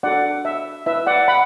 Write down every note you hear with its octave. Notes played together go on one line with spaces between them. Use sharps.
D4 F#4 A4 D5 F#5
E5
E4 B4 E5
D5 F#5
F#5 B5